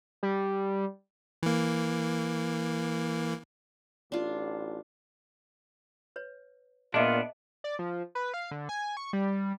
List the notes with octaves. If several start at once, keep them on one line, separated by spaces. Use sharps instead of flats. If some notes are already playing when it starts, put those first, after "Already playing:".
G3
E3 A#3
A1 D4 F4
B4 C#5
A#2 B3 D4 F4 G#4 D#5 E5
D5
F3
B4
F5
D3
G#5
C#6
G3